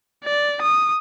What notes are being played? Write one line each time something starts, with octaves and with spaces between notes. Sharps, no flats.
D5
D#6